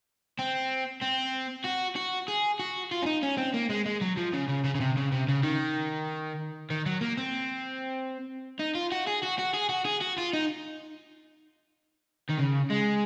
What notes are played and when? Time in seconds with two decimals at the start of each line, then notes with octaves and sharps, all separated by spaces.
0.39 C4
1.01 C4
1.65 F#4
1.96 F#4
2.28 G#4
2.59 F#4
2.91 F4
3.03 C#4
3.06 D#4
3.23 C#4
3.38 C4
3.54 A#3
3.70 G#3
3.86 G#3
4.01 F#3
4.17 F3
4.33 C#3
4.49 C#3
4.64 C#3
4.75 C#3
4.80 C3
4.97 C#3
5.12 C3
5.29 C#3
5.44 D#3
6.70 D#3
6.86 F#3
7.01 A#3
7.17 C4
8.59 D#4
8.75 F4
8.92 F#4
9.07 G#4
9.22 F#4
9.38 F#4
9.54 G#4
9.69 F#4
9.86 G#4
10.01 F#4
10.18 F4
10.33 D#4
12.29 D#3
12.38 C#3
12.70 G#3